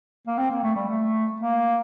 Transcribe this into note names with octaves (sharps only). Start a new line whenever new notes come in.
A#3
C4
A#3
A3
G3
A3
A#3